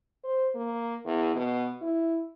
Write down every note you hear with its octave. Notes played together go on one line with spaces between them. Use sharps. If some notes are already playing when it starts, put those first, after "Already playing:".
C5
A#3
E2
B2
E4